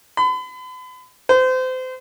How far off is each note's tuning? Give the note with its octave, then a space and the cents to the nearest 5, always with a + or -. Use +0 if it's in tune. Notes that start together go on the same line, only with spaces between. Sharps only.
B5 +40
C5 -30